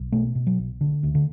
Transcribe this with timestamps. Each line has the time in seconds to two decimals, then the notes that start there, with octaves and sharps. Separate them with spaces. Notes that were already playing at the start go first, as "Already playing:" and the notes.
Already playing: B1
0.12 B2 A3
0.35 B2
0.47 F#3
0.58 B1
0.81 D3
1.03 D2
1.15 D3